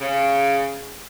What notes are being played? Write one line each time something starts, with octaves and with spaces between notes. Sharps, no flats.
C#3